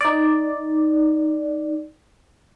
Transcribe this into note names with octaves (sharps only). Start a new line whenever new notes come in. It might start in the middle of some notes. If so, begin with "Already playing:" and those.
D#4 D5